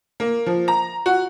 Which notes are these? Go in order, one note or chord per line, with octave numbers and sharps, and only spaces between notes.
A#3
F3
A#5
F#4